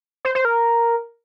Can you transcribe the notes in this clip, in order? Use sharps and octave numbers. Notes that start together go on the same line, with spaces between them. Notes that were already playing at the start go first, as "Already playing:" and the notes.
C5
C5
A#4